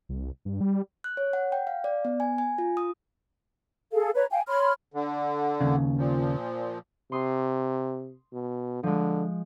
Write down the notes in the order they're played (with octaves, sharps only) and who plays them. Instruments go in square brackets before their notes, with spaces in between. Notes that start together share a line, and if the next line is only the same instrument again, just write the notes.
[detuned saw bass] C2
G2
G3
[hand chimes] F#6
C#5
F#5
G5
F5
D5
B3
G#5
G#5
F4
D#6
[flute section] G#4 A4 F5
B4 C#5 A#5
F5 G5 G#5
C#5 B5 C6 F6
[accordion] D3
[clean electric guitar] D#2 C#3
[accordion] A#2 F3
[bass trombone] C3 [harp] C6 D#6
[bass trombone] B2
[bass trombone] D3 [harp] F3 G#3